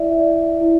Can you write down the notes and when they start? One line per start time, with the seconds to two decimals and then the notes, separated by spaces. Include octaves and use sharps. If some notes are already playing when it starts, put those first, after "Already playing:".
Already playing: E4 D5 E5
0.20 D5
0.61 E4